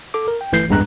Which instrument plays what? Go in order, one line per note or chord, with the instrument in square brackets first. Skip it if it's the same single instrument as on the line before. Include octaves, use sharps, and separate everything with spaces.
[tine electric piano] A4 D6
A#4
G5
G1 E3 A3 G6 C7
A1 E2 G2 G#3 A#5 F#6